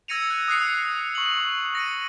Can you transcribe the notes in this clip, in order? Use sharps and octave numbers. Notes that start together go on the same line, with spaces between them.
E6 G#6 A#6 C#7 D#7 F7
F#6
D#6 F#6 C7 C#7
C#6 F#7
A#6 C#7 D#7